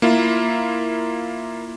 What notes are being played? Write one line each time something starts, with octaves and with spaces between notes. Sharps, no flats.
A#3 E4 F4